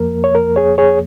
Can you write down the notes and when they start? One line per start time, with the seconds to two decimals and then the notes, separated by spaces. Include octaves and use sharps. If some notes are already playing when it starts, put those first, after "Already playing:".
Already playing: F2 F3 A#3 A#4
0.24 C#5
0.35 A#4
0.56 G#4 C#5
0.78 G#4 C#5